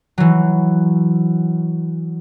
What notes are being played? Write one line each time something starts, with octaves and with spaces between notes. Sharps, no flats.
E3 F#3